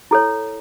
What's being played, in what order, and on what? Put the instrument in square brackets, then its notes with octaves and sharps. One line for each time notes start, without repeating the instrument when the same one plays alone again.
[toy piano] E4 A4 C#5